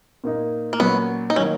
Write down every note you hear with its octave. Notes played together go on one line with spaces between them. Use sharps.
A#2 A#3 D#4
A#3
A#2 F#3 B3 C#4
D#4
D#3 F#3 A#3 C#4